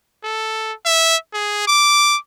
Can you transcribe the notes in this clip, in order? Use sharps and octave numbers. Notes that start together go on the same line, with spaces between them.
A4
E5
G#4
D6